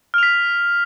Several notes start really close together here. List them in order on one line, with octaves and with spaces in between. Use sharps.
F6 F7 B6